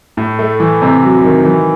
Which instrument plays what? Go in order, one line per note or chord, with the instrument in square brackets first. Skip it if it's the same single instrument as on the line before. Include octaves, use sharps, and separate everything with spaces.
[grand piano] A2
A3
E3
C3
F#3
D#3
E3